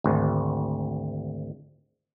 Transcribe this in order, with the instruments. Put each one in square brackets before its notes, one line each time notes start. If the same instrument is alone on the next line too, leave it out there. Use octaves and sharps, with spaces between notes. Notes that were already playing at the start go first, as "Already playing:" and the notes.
[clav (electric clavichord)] G#1 D2